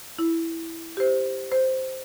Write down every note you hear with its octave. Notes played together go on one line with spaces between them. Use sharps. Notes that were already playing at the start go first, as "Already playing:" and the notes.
E4
G4 C5
C5